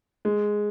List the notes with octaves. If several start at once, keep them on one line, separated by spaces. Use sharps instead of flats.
G#3